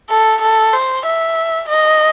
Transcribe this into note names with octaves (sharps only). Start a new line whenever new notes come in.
A4
A4
C5
E5
D#5